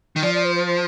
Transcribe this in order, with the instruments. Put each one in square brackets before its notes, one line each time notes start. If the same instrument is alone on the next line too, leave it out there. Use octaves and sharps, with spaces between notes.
[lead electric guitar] D#3
[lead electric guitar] F3 [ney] D5
[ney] D5
C5
C5
C5